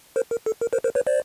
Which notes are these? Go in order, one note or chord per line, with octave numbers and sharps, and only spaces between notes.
A#4 C5
A#4
A4
A#4
A#4 C5
A#4 C5
B4 C#5
C5 D5